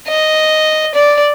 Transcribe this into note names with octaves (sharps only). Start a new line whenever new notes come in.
D#5
D5